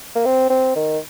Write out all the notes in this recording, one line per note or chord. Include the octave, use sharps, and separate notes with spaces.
A#3
C4
C4
D#3